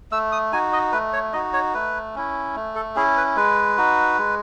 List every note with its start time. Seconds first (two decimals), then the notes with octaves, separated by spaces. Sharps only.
0.12 A3 E6
0.32 D#6
0.52 D#4 F#4 G#5
0.73 D#5
0.92 A3 B4
1.13 C#5
1.33 D#4 F#4 D#5
1.53 C#5
1.74 A3 B4
2.15 C#4 E4
2.56 A3
2.75 A4
2.96 C#4 E4 G#4
3.17 B4
3.36 G#3 B4
3.78 D#4 F#4
4.18 G#3